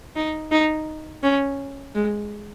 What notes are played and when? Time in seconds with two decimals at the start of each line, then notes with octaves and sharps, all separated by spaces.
0.16 D#4
0.51 D#4
1.23 C#4
1.95 G#3